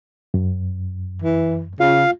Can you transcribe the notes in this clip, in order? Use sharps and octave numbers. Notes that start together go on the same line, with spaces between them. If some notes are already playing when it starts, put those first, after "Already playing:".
F#2
E3
C#3 F4 F5